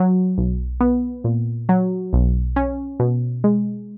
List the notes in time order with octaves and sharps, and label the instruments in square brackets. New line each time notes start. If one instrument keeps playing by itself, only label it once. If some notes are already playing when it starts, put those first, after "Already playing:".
Already playing: [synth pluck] F#3
B1
B3
A#2
F#3
B1
C#4
B2
G#3